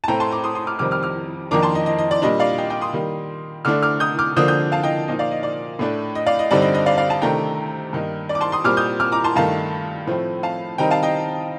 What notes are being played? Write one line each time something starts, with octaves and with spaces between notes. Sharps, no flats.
A5
A2 A3 C4 G5 A#5
A5 C6
A#5 D6
C6 D#6
C6 D#6
D6 F6
F2 C3 D#3 G3 C4 D6 F6
D6 F6
D6 F6
F2 D#3 A#3 D4 A#5 D6
A5 C6
D#5
D#5
D#5
D5
A#2 G3 D4 D#5
D5 F5
D#5 G5
D#5 G5
C6 D#6
D#3 G3 A#3
D3 A3 D4 D6 F6
D6 F6
D#6 G6
D6 F6
D3 F3 A#3 D4 D#6 G6
D#6 G6
F5 A5
D#5 G5
A#2 F3 A#3 D#4 D#5
D5 F5
D#5
D5
A2 A3 D4
D#5
D5 F5
D#5
G2 D3 G3 C4 D#4 D5
D#5
D#5
D5 F5
D5 F5
F5 A5
C3 D#3 A3 D4 G5 A#5
G2 D#3 A#3 D#4
D5
D6
A5 C6
C6 D#6
A#2 G3 C4 D6 F6
D#6 G6
D6 F6
A#5 D6
A5 C6
G2 D#3 A3 F5 A5
A2 F3 A3 C4
F5 A5
D#3 G3 C4 D#4 G5 A#5
F5 A5
D#5 G5